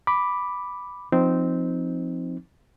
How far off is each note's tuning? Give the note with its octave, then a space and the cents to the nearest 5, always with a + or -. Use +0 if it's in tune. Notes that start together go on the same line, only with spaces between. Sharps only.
B5 +0 D6 +0
F3 +0 C4 -10 D#4 +0